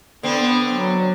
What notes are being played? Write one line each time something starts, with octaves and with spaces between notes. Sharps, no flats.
D3 B3 C4
F#3